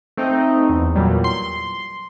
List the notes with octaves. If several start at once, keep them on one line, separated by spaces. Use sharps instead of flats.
A3 C4 D#4
E2
E2 A#2 F#3 G3
C6